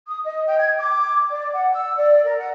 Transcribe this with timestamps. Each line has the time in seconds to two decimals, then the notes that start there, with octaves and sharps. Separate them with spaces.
0.06 D#6
0.24 D#5
0.46 G5
0.58 G#6
0.79 D6
1.30 D5
1.54 F#5
1.73 E6
1.95 D5
2.23 A#4
2.37 F#5